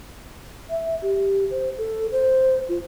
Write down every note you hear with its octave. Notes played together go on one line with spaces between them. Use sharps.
E5
G4
C5
A4
C5
F4